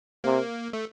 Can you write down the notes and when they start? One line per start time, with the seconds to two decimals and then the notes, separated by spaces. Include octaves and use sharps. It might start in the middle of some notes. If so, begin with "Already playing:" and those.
0.24 C3 A#3
0.73 A3